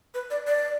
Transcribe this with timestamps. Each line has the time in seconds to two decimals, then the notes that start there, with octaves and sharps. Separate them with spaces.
0.14 B4
0.30 D5
0.47 D5